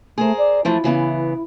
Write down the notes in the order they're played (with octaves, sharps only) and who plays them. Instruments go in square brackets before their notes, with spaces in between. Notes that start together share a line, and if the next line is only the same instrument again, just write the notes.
[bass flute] A3 [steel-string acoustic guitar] G#4 A#4 C5
[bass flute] D5
[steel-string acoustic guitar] E3 F3 A3 [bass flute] E4
[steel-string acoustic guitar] C#3 E3 B3